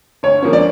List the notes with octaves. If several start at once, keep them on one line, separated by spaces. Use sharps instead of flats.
D2 C#5
D3 F3 A#3 C#4
D5